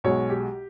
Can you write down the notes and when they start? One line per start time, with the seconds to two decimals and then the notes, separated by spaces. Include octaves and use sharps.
0.04 B1 B2 G#3 C#5
0.30 G4